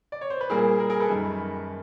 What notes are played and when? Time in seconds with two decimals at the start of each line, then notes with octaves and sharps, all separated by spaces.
0.12 D5
0.21 C#5
0.30 C5
0.41 B4
0.50 A#2 G3 A#3 G#4 A#4
0.79 G#4 A#4
0.90 G#4 A#4
1.00 A4 B4
1.09 F#2 D#3 G3